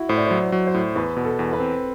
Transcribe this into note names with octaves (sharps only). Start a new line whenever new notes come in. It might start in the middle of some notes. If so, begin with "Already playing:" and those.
Already playing: E4 F#4
A2 C5
D5
C5
F#3
D5
F#3
C5
A2
E2 B4
B2
A4
E2
B4
C4